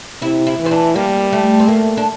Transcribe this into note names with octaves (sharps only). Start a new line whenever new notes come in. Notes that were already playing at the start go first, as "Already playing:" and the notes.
C3 E4
E4
E3
C4
D4
G3 A#3
A3
C4
A3 A#3
D4